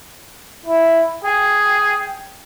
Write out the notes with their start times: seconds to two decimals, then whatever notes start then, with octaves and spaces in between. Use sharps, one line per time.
0.66 E4
1.24 G#4 G5